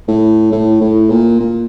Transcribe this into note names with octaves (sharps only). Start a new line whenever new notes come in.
A2
A2
A2
A#2
A#2